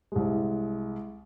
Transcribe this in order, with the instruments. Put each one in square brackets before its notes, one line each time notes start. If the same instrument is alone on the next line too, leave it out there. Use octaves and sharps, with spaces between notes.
[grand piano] C2 G#3